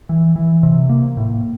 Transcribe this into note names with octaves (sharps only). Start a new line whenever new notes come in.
E3
E3
C3
A#3
A2